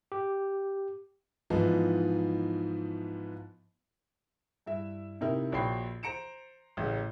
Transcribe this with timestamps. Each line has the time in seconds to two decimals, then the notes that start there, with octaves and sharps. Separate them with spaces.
0.12 G4
1.50 G#2 E3 F3 B3 D#4
4.66 G2 E4 E5
5.21 C3 D#4 E4 A#4
5.52 A#1 F#4 C#5 G5 B5 C7
6.03 C5 A#5 C#7 D7 E7
6.77 A1 C#3